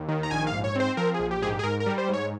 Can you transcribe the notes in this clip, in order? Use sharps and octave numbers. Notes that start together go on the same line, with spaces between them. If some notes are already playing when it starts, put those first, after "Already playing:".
Already playing: D#2
D#3
A#5
A#1 G#5
F5
G#2
C#5
C4 C5
F3 A#4
G#4
A#1
G4
G#2 G4 G#4
G#4
G#2 A#4
A#4
G3
C5
G#2 C#5